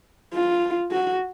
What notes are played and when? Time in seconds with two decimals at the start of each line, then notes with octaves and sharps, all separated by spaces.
0.34 F4
0.92 F#4